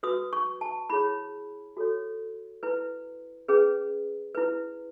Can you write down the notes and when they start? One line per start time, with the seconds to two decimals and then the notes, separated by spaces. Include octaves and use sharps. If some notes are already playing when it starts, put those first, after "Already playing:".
0.03 F#4 B4 D#6
0.33 C#6
0.61 A5
0.90 E4 G#4 C#5 B5
1.77 F#4 A4 C#5
2.63 E4 B4
3.48 C#4 G#4 B4
4.35 E4 B4